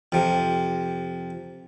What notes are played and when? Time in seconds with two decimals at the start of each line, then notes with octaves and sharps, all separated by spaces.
0.12 F2 C3